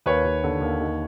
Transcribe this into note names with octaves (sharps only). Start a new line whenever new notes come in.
D#2 B4 C#5
D#2
D3
D#2
D#3